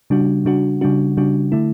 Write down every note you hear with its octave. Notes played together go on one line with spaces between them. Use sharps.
C#3 G3 D4 F#4
C#3 G3 D4 F#4
C#3 G3 D4 F#4
C#3 G3 D4 F#4
D3 A3 E4